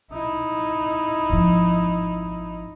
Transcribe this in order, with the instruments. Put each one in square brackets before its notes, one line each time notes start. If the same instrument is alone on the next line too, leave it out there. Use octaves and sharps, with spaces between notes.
[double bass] D#4 E4
[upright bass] G#1 F3